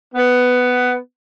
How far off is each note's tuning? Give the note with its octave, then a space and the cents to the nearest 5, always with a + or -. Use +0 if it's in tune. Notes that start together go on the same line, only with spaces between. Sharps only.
B3 +10